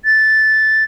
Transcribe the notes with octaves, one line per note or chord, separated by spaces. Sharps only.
A6